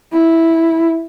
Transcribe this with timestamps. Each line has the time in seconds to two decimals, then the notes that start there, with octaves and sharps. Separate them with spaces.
0.12 E4